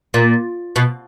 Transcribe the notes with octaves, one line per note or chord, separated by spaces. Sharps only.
A#2
B2